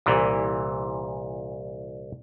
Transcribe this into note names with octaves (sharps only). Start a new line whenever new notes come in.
C2 A#2 E3